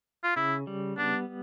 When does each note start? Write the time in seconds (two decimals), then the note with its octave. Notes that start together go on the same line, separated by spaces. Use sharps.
0.24 F4
0.36 C#3 E4
0.67 G3
0.98 B3 D4